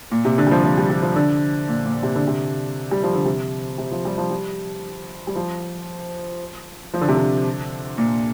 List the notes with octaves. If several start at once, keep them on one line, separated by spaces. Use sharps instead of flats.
A#2
C3
D3
G3
F3
F3
G3
G3
F3
D3
A#2
A#2
C3
D3
C3
G3
F3
D3
C3
C3
F3
G3
F3
G3
G3
F3
F3
D3
C3
D3
A#2